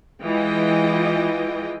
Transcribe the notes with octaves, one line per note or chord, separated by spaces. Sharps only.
E3 G#3 F4 D#5 G5